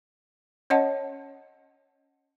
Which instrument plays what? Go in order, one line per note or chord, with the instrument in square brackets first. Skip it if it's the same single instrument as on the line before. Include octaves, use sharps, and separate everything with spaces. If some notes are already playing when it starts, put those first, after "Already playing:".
[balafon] C#4 C#5 D#5 F#5 A5